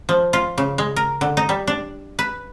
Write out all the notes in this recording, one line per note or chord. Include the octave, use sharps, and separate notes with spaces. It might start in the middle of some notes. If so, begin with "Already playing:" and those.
F3
F4
C#3
G#3
A#4
D3
D#4
G3
D4
B4